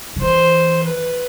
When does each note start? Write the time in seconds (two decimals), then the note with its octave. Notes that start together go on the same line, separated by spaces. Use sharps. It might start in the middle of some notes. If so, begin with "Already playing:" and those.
0.16 D#3
0.21 E3 C5
0.84 B4